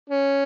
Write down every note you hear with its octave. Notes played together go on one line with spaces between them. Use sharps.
C#4